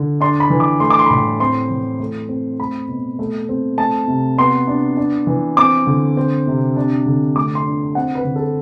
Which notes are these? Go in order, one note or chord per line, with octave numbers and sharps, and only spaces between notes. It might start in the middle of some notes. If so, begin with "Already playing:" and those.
Already playing: D3
D4 C6
B5
E3
D6
A3 C6
D6
C6
B5
A2 C6
C4 C6
E3
A3
C4
A3 B5
B2
A3
C4
A3 A5
C3
B3 C6
D4
D4
E3
C4 D6
D3
C4
C3
D4
D3
A3 D6
C6
D4
C4 F#5
B4
D3
A4